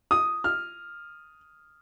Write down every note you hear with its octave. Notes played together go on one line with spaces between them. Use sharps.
D#6
F6